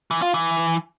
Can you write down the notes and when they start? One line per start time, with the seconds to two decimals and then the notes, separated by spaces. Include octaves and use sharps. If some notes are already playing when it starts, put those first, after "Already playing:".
0.11 E3
0.22 F4
0.34 E3